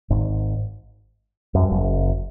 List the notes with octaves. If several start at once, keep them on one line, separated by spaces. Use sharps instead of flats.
G#1 G#2
F#2
G2
F#1 F#2